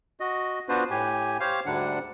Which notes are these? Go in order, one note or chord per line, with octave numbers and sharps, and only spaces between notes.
F#4 D#5
B3 D4 F4 F#4 B4 C5
A2 G4 G#5
G4 C5 C#5 F5
D2 G#2 D3 G3 D4 F#5